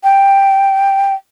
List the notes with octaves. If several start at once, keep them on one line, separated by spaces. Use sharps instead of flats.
G5